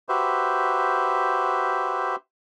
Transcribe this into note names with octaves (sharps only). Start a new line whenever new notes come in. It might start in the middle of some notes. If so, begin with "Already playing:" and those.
F#4 G4 B4 C5 E5